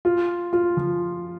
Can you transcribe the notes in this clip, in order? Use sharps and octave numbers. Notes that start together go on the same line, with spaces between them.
F4
F4
F3